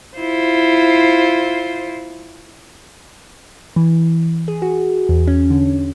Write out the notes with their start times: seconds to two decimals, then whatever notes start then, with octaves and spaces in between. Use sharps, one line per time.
0.18 E4 F4 C5
3.76 E3
4.48 G#4
4.62 F#4
5.09 E2
5.27 C#4
5.50 D3